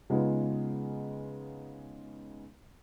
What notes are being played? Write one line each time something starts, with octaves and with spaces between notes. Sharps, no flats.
C#3 G#3 B3 D#4 F4